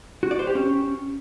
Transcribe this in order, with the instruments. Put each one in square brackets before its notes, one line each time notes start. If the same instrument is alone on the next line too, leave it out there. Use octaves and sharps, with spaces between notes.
[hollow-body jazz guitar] F#4
D5
C5
G4
C#4